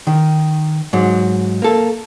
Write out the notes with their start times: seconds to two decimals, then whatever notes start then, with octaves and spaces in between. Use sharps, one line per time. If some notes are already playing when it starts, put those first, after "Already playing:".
0.07 D#3
0.93 G#2 F#3
1.62 A#3 A4